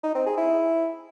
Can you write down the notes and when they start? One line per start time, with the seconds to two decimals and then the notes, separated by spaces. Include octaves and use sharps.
0.04 D#4
0.15 C4
0.26 G#4
0.38 E4